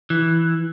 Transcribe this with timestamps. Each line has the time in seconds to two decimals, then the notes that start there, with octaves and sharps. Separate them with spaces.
0.10 E3